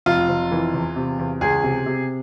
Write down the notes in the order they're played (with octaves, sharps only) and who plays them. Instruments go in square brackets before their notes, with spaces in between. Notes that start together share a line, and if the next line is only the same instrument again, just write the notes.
[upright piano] F1 F4
F1
E3
E2
C3
E2
C#2 G#4
C3
C3